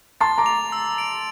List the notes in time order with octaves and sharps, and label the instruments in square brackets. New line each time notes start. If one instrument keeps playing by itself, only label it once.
[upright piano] A5 C6 [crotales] A6
[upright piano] A#5 D6
[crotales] F7
E6
D7